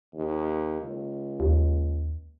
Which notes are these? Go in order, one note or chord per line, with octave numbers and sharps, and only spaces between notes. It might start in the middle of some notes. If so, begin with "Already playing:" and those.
D#2
C#2
D#2